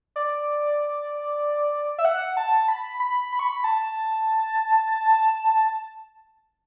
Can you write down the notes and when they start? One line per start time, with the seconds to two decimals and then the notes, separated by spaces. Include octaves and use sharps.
0.16 D5
1.98 E5
2.05 F#5
2.37 A5
2.68 B5
3.00 B5
3.32 B5
3.39 C#6
3.47 B5
3.64 A5